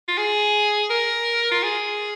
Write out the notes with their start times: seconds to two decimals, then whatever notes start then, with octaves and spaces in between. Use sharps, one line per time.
0.08 F4
0.18 G#4
0.90 A#4
1.52 F4
1.63 G#4